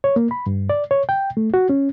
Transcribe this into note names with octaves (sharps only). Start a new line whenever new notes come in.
C#5
A#3
B5
G2
D5
C#5
G5
A3
F#4
C#4